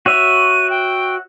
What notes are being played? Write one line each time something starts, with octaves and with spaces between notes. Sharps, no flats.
F#4 C#5 E5 D#7
G5